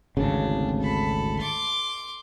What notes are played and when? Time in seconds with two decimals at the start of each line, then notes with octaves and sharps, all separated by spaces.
0.17 G#1 D2 C#3 D4
0.80 A4 B5
1.39 C6 D6